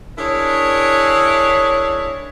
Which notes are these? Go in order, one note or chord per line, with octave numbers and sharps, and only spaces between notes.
D4 E4 G#4 A#4 C#5